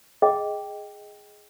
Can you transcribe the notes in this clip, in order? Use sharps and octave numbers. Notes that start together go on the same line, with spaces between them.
G#4 D#5 G5